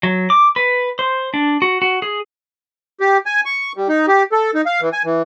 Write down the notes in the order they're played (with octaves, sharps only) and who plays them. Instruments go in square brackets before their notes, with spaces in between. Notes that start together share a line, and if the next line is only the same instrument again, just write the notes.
[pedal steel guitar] F#3
D6
B4
C5
D4
F#4
F#4
G#4
[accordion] G4
G#5
C#6
G3
D#4
G4
A4
D#4
F5
E3
G#5
E3